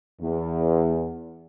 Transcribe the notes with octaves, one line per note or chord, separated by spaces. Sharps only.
E2